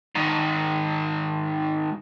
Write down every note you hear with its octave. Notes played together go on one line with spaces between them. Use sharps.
G#2 D#3